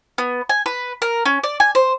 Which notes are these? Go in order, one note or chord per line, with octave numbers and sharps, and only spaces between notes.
B3
G#5
B4
A#4
C#4
D5
G#5
C5